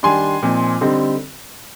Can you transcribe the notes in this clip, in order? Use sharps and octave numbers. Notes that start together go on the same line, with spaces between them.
D#3 G3 D4 G#5 C6
A#2 F3 C4 D#4
D3 G3 C4 D#4